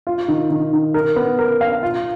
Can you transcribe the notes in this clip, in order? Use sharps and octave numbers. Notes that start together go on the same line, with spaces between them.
F4
D#3
D#3
D#3
A#4
B3
A#4
F5
F4